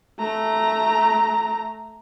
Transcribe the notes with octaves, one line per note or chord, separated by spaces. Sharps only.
A3 A#5